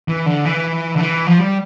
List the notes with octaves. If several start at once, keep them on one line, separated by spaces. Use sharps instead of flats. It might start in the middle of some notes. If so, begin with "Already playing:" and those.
E3
D3
E3
D3
E3
F3
G3